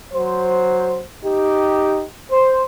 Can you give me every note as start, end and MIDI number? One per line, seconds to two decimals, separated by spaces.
0.14 1.04 54
0.14 1.04 72
1.24 2.05 63
1.24 2.05 67
2.31 2.65 72